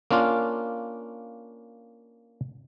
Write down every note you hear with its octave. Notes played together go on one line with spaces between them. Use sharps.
A#3 C#4 D4 F4